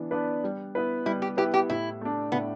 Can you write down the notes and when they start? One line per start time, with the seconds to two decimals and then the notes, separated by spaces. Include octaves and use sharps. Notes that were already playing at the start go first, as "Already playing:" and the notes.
Already playing: E3 B3 D4
0.11 B3 D4 B4 D5
0.44 G3
0.75 B3 E4 B4
1.06 G3 E4
1.22 G4
1.37 B3 E4 G4 B4
1.54 G4
1.70 A2 E4
2.01 A3 D4
2.32 A2 B3